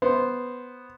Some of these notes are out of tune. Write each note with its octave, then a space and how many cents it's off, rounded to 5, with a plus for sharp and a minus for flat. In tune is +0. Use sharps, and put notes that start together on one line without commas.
B3 +0 C5 +0